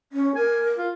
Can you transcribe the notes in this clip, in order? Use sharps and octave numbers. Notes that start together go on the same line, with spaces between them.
C#4
A#4 G#5
F4